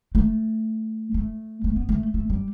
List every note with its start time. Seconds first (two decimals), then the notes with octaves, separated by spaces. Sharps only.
0.15 A3
1.14 A3
1.64 A3
1.76 B3
1.89 A3
2.14 A3
2.30 G3